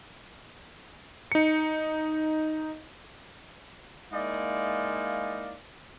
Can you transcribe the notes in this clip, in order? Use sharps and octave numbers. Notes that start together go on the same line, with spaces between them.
D#4 C#7
G#3 A#3 D#4 E4 D5 F5